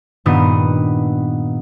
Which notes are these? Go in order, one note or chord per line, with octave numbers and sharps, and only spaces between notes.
G2 A#2 D#3 B3 D#6